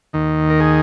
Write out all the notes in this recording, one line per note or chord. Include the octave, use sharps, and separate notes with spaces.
D#2 D#3
A#4
G#4